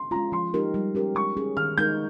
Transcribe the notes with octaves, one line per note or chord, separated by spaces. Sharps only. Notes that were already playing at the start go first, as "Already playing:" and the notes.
Already playing: C6
G#3 C#4 F4 A#5
F3 C6
G#3 D#4 G4 A#4
G3
C#4 G4 A#4
G#3 C#6
C#4 G#4
D#3 F6
G#3 D#4 A#4 G6